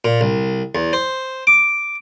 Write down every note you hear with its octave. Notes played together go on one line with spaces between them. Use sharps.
A#2
C2
E2
C5
D6